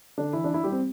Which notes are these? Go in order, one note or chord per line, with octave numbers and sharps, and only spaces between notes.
D3 D4
E3 E4
D4
E4
G3 G4
C4